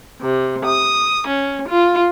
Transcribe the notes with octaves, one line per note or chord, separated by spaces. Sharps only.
C3
D#6
C#4
F4